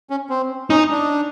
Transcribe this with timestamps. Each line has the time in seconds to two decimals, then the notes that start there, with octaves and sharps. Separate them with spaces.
0.10 C#4
0.30 C4
0.70 C#4 D#4
0.91 D4